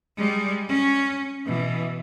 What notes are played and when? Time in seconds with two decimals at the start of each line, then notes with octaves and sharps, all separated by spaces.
0.17 G3 G#3
0.69 C#4
1.46 B2 E3